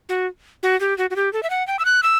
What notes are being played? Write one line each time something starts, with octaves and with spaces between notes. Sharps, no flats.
F#4
F#4
G4
F#4
F#4
G4
A4
E5
F#5
G5
E6
F#6
E6